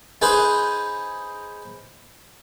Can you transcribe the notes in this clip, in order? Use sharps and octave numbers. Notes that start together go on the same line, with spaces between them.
D#4 G#4 B4 C5